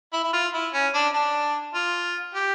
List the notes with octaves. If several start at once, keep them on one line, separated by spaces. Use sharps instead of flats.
E4
E4
F4
E4
C#4
D4
D4
F4
G4